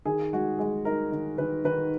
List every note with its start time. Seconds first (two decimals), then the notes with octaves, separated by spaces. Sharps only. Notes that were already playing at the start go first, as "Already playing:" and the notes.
0.05 D#3 G#4
0.33 G#3 F#4
0.59 G#3 G#4
0.85 D#4 A#4
1.12 D#3
1.38 D#3 B4
1.65 D#3 B4